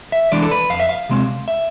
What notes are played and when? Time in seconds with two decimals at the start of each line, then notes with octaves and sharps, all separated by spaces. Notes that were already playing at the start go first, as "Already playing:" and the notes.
0.12 E5
0.32 E3 G#3 D4 D5
0.42 A4
0.51 B4
0.70 F2 F5
0.80 E5
0.89 F5
1.09 C3 G#3 C4
1.48 E5